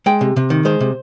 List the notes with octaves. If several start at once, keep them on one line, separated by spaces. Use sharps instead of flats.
G#3 G5
C3
C3
D#3
G#3 C5
C3